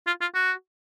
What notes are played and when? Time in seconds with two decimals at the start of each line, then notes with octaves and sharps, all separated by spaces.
0.07 F4
0.21 F4
0.35 F#4